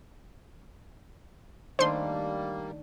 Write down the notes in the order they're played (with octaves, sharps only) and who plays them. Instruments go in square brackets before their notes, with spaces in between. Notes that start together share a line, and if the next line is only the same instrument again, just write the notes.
[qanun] D#3 A3 D4 [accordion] G3 A#3 [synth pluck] C5 C6